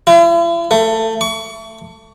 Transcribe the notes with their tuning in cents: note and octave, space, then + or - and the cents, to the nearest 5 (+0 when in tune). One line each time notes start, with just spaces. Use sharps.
E4 +45
A3 +20
C#6 +30